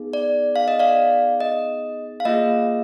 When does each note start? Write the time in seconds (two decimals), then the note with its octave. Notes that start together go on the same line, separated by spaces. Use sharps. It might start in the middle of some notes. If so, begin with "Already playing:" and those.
Already playing: B3 D#4 G#4
0.13 D5
0.56 F5
0.68 D#5
0.79 D5 F5
1.40 D#5
2.20 F5
2.25 A#3 F4 G#4 D#5